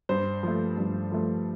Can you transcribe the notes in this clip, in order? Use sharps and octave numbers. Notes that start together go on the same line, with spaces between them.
G2 C5
F3 A3
G2
F3 A3